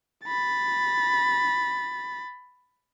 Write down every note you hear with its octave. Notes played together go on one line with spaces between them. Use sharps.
B5 A6